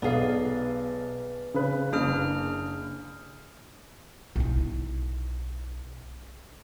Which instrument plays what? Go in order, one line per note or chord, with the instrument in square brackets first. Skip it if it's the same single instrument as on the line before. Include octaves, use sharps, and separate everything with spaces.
[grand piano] B1 [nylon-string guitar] B3 G#4 [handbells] D5 F5
[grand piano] C#3 B4
[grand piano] F#1 [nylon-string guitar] A#3 [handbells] D4 G#4 F6
[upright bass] B1 E4